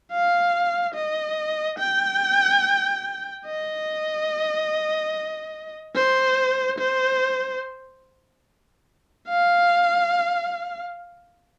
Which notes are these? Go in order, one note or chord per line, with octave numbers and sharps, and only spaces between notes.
F5
D#5
G5
D#5
C5
C5
F5